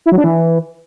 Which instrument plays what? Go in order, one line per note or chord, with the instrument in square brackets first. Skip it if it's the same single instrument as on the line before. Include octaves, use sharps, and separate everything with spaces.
[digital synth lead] E4
F#3
D4
E3